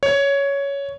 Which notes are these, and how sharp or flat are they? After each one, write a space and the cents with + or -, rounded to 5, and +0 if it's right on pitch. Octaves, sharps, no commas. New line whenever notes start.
C#5 +10